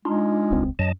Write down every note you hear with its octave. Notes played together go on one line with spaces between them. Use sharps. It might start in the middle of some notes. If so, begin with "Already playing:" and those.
G#3 D4 D#4 F4
D#1 C#2 C4
F#2 F#3 D#5 A5